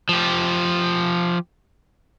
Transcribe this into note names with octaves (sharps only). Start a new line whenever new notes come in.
F3 G4